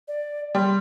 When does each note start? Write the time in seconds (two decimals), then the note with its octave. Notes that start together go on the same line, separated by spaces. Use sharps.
0.08 D5
0.55 G3 C6